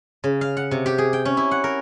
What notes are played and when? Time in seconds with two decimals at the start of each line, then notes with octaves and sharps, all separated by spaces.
0.24 C#3
0.41 F5
0.57 F#5
0.71 C3
0.86 G4
0.98 G#4
1.13 G5
1.25 C#4
1.37 E4
1.51 F#5
1.64 A#4